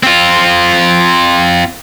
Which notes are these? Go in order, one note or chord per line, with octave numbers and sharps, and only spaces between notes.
C4 F4